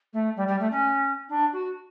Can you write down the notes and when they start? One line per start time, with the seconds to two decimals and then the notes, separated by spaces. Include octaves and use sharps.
0.13 A3
0.36 G3
0.47 G3
0.59 A3
0.71 C#4
1.29 D4
1.52 F#4